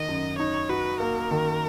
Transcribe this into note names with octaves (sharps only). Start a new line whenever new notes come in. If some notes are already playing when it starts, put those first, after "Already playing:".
Already playing: D#3 D#4 D#5
F#2
D#4 C#5
F#4 B4
A#3 A#4
D#3